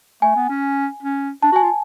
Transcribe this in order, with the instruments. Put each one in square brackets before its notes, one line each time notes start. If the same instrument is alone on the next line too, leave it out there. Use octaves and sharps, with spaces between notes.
[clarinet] A3 [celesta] G#5
[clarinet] B3
C#4
C#4
[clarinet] D4 [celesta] A5
[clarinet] F#4
[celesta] G#5
[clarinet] F4